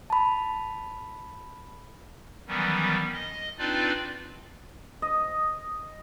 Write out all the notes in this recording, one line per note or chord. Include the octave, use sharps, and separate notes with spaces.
A5 B5
D#3 E3 F#3 G3 B3 C#4
D#5
C4 D4 D#4 F4 B4 D5
D#5